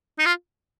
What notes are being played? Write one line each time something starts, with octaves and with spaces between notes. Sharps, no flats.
D#4
F4